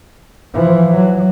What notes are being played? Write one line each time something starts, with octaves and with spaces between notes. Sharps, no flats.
E3 F3
F#3